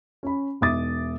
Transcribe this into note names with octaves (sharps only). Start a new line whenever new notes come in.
C#4 B5
E1 D#4 E5 D6 D#6 A6